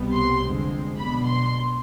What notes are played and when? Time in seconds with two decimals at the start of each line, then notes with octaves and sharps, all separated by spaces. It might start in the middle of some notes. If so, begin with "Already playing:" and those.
Already playing: C2 B2 G3 B3
0.13 C6
0.41 F2 D3 G#3 C4
0.97 B1 B2 B3 D4 B5
1.26 C6